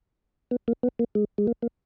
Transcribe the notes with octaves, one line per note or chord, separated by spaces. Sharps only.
B3
A#3
B3
A#3
G#3
G#3
A#3
A#3